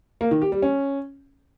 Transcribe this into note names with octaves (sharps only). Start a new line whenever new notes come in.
A#3
D#3
G4
G3
C#4